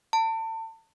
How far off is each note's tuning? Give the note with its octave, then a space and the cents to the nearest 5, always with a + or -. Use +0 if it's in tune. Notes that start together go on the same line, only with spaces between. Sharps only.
A5 +30